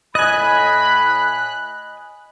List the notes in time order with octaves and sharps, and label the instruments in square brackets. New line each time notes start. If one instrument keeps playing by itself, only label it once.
[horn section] A2 B5 [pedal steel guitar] D#5 G#5 [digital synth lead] F#6